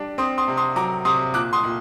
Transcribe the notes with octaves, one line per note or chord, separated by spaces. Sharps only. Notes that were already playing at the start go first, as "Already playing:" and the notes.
Already playing: G3 D4
C4 C6 D#6
C6 D#6
C3
C6 D#6
F#3 A#5 D6
C3 C6 D#6
A#2 D6 F#6
C6 D#6
A#2